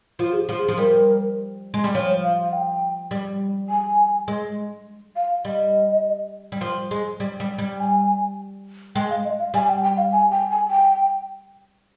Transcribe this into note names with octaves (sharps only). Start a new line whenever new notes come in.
F3 F4
G#4
G4
F3
G#4
F3
G3 A#4
G#3
G3
F3 C#5
F5
F5
G5
G3
G#5
G#3
F5
G3 D#5
G3
F3
G#3
G3
G3
G3
G#5
G#3 G5
F5
D#5
F5
G3 G#5
G5
G5
F5
G#5
G5
G#5
G5